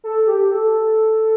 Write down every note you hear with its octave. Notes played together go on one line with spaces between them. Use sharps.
A4
G4
A4